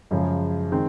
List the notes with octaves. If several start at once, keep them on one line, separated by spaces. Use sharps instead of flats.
F#2 C#3 F3 G#3
D#3 G#3 C4